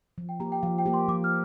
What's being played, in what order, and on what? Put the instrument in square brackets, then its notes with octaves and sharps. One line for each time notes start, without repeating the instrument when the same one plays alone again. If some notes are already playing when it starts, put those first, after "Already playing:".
[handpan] F3
[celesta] G5
[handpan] A#3 G4 [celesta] A#5
[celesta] G5
[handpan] F3 [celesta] F5
[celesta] G5
[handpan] A#3 G4
[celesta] C6
[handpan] F3 [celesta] D6
[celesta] F6